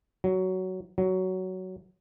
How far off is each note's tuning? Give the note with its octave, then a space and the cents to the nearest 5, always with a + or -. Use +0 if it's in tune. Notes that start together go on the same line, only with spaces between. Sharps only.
F#3 +10
F#3 +10